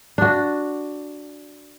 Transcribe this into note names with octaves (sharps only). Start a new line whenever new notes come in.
D4 F#4